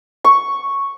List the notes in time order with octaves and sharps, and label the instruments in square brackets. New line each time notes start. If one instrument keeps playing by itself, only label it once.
[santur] C#6